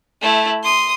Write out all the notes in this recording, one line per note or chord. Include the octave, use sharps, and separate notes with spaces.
A3 E4
C6 D#6